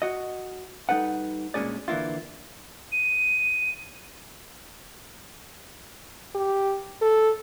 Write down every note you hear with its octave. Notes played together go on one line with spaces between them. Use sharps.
F#4 D#5
G3 D#4 A4 B4 F#5
G2 A#2 G#3 C#4 G#4 D5
D3 E3 A#3 E4 F4
D#7
G4
A4